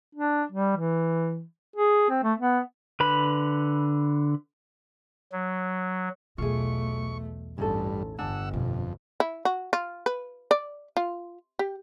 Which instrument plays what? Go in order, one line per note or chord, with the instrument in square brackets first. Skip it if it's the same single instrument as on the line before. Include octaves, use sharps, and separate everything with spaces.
[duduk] D4
G3
E3
G#4
C4
A3
B3
[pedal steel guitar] D3 B4 B5
[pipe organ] F#3
[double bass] B1 A3 [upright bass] E2 B2 [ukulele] F4 G#4 [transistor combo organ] C#6
[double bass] A1 [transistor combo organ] G2 [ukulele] C#4 D#4 A4
[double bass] G1 G2 [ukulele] D4 G#5 [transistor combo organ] F#5 E6
[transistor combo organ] F2 [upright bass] B2
[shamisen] E4
F#4
F4
B4
D5
F4
G4